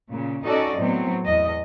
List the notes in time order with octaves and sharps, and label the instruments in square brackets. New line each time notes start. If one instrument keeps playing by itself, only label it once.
[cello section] A#2 C#3
C#4 D#4 F#4 A4 D5 D#5
A2 F#3 B3 C4
E2 D#5